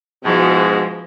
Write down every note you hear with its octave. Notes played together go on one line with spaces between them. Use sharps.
G#2 B2 F3 G#3 E4 F#4